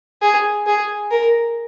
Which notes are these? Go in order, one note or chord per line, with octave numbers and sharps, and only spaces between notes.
G#4
G#4
A#4